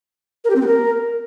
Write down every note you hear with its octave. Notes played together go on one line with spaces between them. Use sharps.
A#4
G4
C4
B3
A#4